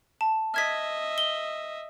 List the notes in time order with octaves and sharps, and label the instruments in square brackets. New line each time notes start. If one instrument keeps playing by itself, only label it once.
[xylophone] A5
[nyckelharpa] D#5 E5 [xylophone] F6 G#6 B6
[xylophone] G7